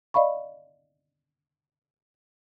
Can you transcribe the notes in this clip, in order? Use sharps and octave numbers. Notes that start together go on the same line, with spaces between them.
D5 D#5 F5 B5 C#6